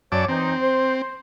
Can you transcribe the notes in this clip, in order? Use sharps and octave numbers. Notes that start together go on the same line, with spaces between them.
F#2 C#5 D5 A5 D6
E3 C4 D#4
C5